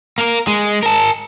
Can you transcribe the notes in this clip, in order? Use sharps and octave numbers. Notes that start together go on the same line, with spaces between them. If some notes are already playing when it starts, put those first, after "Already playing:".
A#3 A#4
G#3
A#4 A5